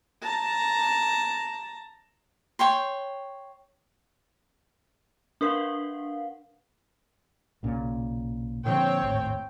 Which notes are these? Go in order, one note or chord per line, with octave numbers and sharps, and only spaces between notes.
A5 A#5
C#5 G5 C6
D4 A#4 B4 F5 F#5
B1 A#2 C#3
A#2 D3 F3 C4 C#5 G5
G#1 D#2 A2